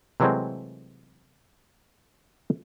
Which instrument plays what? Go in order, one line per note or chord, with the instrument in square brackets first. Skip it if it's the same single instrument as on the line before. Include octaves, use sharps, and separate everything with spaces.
[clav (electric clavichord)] C3 E3 F#3 G#3 A3 C4